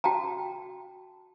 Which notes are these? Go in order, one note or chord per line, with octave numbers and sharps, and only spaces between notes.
F#4 G5 A5 A#5